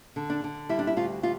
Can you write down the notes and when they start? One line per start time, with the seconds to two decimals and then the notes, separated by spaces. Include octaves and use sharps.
0.16 D3
0.30 D4
0.44 D3
0.69 G3 E4
0.79 D4
0.87 E4
0.97 D2 F4
1.23 G3 F4